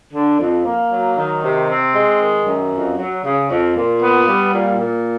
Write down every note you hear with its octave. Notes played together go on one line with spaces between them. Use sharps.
D3
F2
A#3
F#3
D#3
C3
C4
G#3
D#3
F#2
F2
F#3
C#3
F2
A#2
B3
G3
A#2
A#2